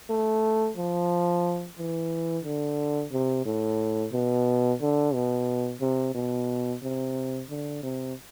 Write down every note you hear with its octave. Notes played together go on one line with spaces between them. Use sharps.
A3
F3
E3
D3
C3
A2
B2
D3
B2
C3
B2
C3
D3
C3